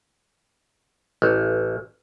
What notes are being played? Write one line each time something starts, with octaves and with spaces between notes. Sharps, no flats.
A1